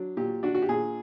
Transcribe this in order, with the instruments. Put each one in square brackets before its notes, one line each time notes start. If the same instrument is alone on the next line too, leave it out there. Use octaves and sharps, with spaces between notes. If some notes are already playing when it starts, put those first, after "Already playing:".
Already playing: [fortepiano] F#3 D4
A#2 G4
D4 F#4
F#4
G4
A#2 G#4